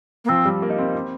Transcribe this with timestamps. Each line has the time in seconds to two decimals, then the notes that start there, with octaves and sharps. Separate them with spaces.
0.25 A#3
0.29 F3 C4
0.45 G3
0.62 A#3
0.70 D#4
0.78 C4
0.94 C4